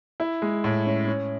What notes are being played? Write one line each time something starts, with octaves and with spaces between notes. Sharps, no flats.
E4
G#3
A2
C#4
C#4